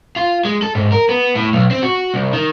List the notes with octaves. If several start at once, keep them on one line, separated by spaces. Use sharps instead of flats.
F4
G#3
A4
G#2
A#4
B3
A2
B1
C4
F#4
C2
D#3